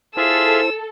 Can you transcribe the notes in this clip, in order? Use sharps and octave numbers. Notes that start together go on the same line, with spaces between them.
E4 F4 G#4 A4 C5 E5 E6